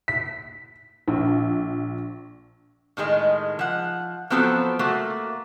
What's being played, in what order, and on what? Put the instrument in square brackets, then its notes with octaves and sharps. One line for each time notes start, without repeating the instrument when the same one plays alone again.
[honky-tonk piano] B6
A#1
[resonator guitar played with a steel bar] A2 D#3 G#3 D#5
F3 F#5
F3 F#3 B3 C4 F#4 A4
A3 A#3 F#4